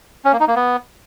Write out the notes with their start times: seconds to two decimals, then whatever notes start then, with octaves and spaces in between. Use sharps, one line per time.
0.25 C#4
0.32 A#3
0.40 D#4
0.48 A#3
0.56 B3